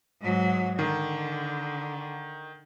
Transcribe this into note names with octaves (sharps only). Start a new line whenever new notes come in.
G#2 F#3
D3 D#3